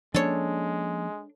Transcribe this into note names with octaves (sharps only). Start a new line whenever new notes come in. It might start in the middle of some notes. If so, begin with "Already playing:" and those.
F3 G#3 A#3 C#4 D4 A4 C#5